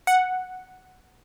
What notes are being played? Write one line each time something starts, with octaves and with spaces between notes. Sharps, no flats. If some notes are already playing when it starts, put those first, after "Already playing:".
F#5